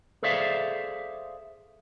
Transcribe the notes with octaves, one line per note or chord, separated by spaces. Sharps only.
G#4 A4 C5 D5 E5 F5